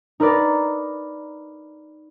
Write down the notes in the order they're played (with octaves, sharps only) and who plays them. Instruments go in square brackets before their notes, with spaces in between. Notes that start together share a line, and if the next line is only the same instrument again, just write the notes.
[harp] D#4 A#4 B4 D5